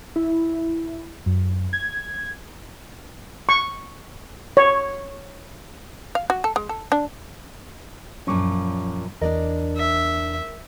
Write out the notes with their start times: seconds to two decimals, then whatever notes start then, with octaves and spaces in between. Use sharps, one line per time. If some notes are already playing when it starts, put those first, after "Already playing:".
0.16 E4
1.26 F#2
1.73 G#6
3.49 C#6
4.57 C#5
6.15 F5
6.30 F#4
6.44 A4
6.56 G#3
6.69 A4
6.92 D4
8.27 F#2 A#2 F3 C#4 C#6 D6
9.22 E2 D4 A#4 D5 D#5
9.77 E5